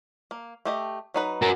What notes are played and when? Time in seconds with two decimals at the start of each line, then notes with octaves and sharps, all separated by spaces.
0.31 A#3
0.65 A3 G4 D#5
1.14 F#3 D#4 B4
1.42 F#4 A#4